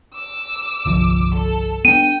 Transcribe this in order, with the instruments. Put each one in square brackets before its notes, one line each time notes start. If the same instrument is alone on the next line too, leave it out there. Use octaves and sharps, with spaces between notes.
[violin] D6 E6
[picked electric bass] G1 C2 F3
[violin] A4
[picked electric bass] B3 D4 [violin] G5 [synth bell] D#7